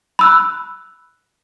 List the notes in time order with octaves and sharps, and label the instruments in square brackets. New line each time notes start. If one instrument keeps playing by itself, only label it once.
[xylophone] B5 E6 F#6